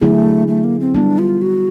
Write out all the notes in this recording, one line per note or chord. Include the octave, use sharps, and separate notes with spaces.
D3 F#3 A3 B3 E4 G#4
A3
A#3
C4
G3 B3 D4 E4
F4
F#4